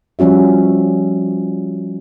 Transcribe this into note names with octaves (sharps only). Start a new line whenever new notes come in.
F3 G3 C#4 F#4 E5